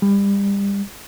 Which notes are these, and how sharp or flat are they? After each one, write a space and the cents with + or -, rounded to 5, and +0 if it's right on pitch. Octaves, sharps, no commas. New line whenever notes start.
G3 +30